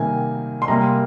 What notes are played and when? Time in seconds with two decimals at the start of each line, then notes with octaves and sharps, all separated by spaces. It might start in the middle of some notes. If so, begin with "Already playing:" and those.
Already playing: C3 D#3 G3 A#3 G#5
0.62 C6
0.68 C3 G3 A#3 A#5